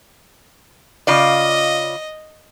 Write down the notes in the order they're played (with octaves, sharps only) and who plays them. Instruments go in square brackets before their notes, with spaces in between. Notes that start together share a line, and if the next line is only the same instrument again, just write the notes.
[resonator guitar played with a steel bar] C#3 F4 D5 [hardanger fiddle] D#5